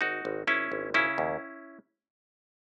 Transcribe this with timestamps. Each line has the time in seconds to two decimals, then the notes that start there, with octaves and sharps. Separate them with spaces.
0.01 G#1 D#4 F#4
0.25 G#1
0.47 G#1 C#4 E4
0.72 G#1
0.94 C#3 C#4 E4
1.18 D#2